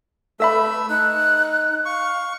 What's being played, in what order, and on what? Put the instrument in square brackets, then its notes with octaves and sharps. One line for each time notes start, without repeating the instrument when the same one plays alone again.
[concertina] A3 E6 [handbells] A4 E5 B5 [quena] B4
[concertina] D#4 [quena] F#6
[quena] F5 [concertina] C#6